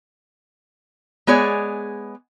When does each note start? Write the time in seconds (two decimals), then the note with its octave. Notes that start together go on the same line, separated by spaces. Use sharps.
1.27 G#3 B3 G#4 C#5 D5